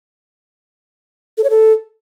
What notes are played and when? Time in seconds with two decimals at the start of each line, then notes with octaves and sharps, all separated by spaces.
1.38 A4
1.44 C#5
1.50 A4